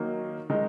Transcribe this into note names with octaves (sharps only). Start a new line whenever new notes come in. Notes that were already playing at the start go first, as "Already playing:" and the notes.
Already playing: D#3 F#3 A#3 D#4
D#3 G#3 D#4